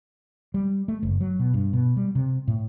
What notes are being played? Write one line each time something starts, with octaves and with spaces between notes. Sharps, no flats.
G3
A3
F#1
F#3
B2
G2
B2
G3
C3
A2